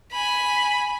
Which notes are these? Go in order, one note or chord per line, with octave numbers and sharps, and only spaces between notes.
G#5 B5